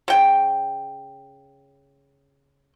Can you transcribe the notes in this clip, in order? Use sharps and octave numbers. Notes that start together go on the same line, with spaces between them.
C#3 G5